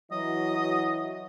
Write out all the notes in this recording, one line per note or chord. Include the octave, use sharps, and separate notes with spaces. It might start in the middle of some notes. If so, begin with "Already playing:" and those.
E3 F#3 D#5